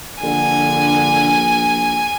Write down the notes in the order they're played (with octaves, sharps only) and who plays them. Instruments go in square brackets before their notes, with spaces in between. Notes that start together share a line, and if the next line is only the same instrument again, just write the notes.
[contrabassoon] A#1 [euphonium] D3 [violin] G#5